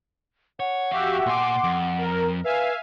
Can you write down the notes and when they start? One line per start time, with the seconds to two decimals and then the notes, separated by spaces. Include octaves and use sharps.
0.60 C#5 F#5
0.91 F2 F#4 G4 E5 F5
1.26 A#2 G#5 C6 D6
1.64 F2
1.98 A#4
2.44 B4 E5 F5 G#5